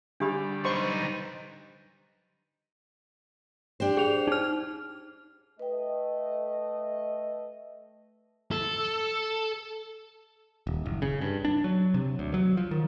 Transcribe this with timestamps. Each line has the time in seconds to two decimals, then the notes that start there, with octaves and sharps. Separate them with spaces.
0.20 D3 G3 D4 G4 B5
0.65 D#4 B4 C5 C6 C#6
3.80 D4 G4 C5
3.97 G#4 F7
4.27 D#4 F6
5.59 A3 B4 D#5 G5
8.52 A4
10.67 D#1
10.85 F#1
11.02 C#3
11.21 G2
11.45 D4
11.64 F#3
11.94 C3
12.19 D2
12.34 F#3
12.57 F3
12.71 D#3